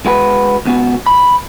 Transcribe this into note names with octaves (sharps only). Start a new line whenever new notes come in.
G#3 F#4 B4
C#2 B3 F#4
B5